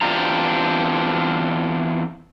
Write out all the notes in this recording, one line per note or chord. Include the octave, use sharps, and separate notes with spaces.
E2 C4 D4 F4 G4 A#5